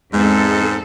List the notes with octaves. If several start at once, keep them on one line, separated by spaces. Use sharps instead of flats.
E2 G#2 G#3 C4 A4